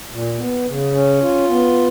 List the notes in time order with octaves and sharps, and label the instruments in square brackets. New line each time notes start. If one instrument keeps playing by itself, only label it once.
[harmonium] A#2
B3
C#3
C#4
F4
B3